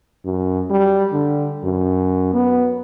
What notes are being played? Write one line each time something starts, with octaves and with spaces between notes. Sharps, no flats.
F#2
G3
D3
F#2
B3